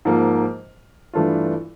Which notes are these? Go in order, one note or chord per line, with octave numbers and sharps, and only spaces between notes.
G#2 F3 A#3
G2 E3 A3 D4 F4